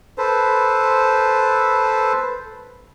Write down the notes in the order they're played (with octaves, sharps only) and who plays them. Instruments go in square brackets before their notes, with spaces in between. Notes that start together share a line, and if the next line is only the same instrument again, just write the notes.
[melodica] A4 B4 C5